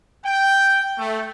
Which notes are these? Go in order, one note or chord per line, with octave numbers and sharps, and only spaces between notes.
G5
A3